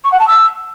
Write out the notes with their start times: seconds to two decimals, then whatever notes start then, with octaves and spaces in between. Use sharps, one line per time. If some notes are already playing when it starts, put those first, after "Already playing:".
0.04 C#6
0.12 F#5
0.20 A5
0.27 E6